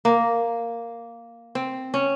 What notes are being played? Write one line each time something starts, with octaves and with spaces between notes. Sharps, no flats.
A#3
C4
C#4